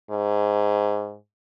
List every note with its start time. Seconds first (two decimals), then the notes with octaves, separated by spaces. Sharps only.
0.10 G#2